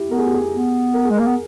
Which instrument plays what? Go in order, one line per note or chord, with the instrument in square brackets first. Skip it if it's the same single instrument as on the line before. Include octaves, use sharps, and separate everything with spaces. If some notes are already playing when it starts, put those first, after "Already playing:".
Already playing: [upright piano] E4 G4
[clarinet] B3 [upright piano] A#4
[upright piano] G#4
G4
G#4
[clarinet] B3
[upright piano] A#4
[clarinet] G#3 [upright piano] G#4
[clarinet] A#3 [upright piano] A#4
[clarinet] B3